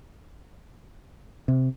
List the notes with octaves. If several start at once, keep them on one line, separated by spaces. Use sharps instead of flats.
C3